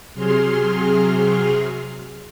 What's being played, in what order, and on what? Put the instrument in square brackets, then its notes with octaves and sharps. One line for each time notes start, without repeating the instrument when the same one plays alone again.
[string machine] C3 F#3 G#4 C6 F6